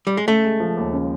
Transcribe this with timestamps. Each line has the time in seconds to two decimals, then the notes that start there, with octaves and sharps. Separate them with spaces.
0.07 G3
0.17 G#3
0.28 C#3 A3
0.45 G#3
0.60 F3
0.77 D#2
0.93 C#3